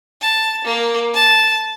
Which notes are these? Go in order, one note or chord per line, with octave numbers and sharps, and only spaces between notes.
A5
A#3
A5